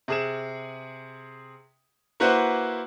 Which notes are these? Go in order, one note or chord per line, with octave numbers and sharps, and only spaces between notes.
C3 G#4 E7
A#3 E4 F#4 B4 C5 F#5